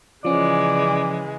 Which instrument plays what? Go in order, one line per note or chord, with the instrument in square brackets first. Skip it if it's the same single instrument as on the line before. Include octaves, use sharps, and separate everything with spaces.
[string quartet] C#3 E3 G#3 [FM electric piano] F3 C#4 [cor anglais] D5